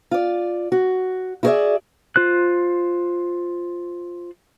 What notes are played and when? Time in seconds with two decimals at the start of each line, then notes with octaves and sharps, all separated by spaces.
0.11 F4 D5
0.72 F#4
1.43 E4 F#4 G#4 C5 D5 E5
2.16 F4 C5 F#6